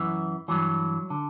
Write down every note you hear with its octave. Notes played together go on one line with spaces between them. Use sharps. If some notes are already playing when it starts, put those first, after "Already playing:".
Already playing: F#2 E3
G2 E3 F#3
D3